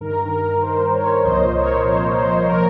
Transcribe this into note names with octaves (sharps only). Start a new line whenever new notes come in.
G2 D#3 A#4
A#4
G2 D#3 C5
A#4 C#5
C2 A#2 F3 C5 D#5
A#4 C#5
C2 A#2 F3 C5
C5
A#2 F3 A#4